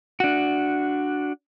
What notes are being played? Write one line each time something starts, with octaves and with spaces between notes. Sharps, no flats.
D4 F#4